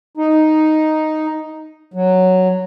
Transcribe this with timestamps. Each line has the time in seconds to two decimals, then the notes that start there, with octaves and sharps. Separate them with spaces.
0.17 D#4
1.94 F#3